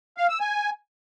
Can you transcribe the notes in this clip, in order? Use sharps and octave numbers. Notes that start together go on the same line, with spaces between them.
F5
E6
G#5